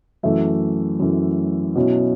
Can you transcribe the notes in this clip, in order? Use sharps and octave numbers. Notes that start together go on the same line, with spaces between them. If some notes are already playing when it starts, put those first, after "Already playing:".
F#2 E3 A3 E5
F#2 E3 A3
B2 F#3 C#4 E4